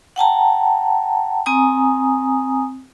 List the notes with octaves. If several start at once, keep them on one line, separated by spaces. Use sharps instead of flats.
F#5 G5 A5 A#5
C4 G#5 A#5 D#6